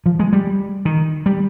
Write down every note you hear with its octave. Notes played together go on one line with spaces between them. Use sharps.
F3
G#3
G3
D#3
G3